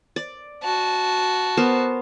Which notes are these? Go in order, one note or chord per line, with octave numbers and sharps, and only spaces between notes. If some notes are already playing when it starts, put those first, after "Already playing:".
D5
F#4 A5
B3 A#4 C5